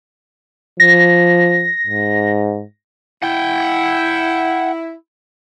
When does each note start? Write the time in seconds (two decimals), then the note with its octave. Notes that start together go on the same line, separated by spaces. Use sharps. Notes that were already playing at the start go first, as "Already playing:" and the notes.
0.80 F3 A#6
1.87 G#2
3.22 E4 F#5 G5